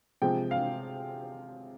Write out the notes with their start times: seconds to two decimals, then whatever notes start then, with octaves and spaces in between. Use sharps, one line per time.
0.22 C3 F3 G#3 G5
0.51 F5